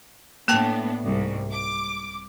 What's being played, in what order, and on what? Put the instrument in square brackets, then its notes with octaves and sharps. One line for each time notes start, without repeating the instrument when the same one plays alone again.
[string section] A2 B3 D4 [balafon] A#3 G5 A5
[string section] C2 G#2
D6